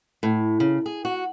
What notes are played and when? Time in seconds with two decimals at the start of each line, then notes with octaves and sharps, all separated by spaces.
0.23 A2
0.60 C#3
0.86 G#4
1.05 F#4